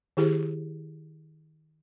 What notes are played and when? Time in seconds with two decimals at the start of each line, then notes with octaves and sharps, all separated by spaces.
0.17 D#3 E4 G4 G#4 C5